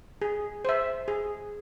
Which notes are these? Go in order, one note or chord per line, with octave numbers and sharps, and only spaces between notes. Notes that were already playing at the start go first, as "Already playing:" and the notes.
G#4
C5 E5
G#4